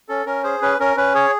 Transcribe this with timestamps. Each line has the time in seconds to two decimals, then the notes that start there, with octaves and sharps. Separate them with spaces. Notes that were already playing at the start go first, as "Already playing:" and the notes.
0.09 C#4 A4
0.26 C#4 A#4
0.43 G#4 C5
0.62 C#4 B4
0.80 C#4 A#4
0.97 C#4 B4
1.15 G#4 C#5